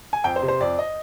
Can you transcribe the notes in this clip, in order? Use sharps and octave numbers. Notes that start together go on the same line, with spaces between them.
G#5
F2 G5
C5
C3
C5
F2 D5
D#5